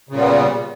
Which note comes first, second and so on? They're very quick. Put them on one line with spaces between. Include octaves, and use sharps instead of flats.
C#3 A#2 G3 B3